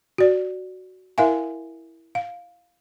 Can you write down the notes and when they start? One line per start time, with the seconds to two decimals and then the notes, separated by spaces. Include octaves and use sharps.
0.18 F#4 D5
1.18 E4 A#4 E5 F5 G#5
2.15 F5